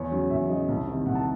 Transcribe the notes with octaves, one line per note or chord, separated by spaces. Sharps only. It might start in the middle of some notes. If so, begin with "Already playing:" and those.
Already playing: E2 C#5
C#3 F#3
E2 E5
C#3 F#3 D#5
C2
C3 D#3
C2 F#5
A5